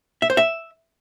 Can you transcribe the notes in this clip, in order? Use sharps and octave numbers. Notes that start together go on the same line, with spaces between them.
E5
C5
E5